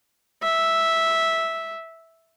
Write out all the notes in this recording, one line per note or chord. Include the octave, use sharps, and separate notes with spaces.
E5